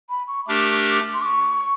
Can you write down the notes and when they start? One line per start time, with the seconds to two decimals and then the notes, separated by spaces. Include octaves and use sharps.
0.10 B5
0.28 C#6
0.47 A3 D4 G4 A#4 D6
1.14 C6
1.22 D6
1.26 C#6